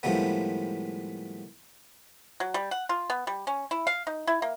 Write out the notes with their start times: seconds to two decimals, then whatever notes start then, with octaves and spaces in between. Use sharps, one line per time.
0.03 A2 D#3 F3 G3 G#3 B3
2.40 F#3
2.54 G3
2.71 F#5
2.89 F4
3.10 B3
3.27 G3
3.47 C#4
3.71 E4
3.87 F5
4.07 D#4
4.27 E4
4.42 A#3